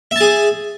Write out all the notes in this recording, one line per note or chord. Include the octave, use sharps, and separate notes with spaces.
G#4 E5 A5